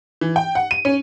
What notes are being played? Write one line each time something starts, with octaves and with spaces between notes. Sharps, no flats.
E3
G5
F#5
D#7
C#4